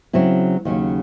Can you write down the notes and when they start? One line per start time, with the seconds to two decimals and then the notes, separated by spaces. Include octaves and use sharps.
0.13 C#3 F#3 C4 E4
0.65 D#2 C#3 F#3 C#4